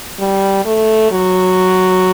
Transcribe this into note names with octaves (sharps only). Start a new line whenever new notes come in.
G3
A3
F#3